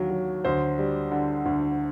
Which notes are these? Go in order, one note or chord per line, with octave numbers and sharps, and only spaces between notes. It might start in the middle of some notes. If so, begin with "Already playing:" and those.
Already playing: D#2 D3 F#3
F#3
D2 C5
G3
D3
D2